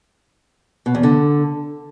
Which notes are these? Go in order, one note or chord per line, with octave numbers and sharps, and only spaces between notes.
B2
E2
D3